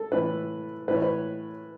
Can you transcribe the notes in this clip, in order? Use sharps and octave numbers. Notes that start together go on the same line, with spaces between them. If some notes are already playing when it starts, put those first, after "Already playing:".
Already playing: A4
A2 E3 B4
A2 E3 B4
C#5
B4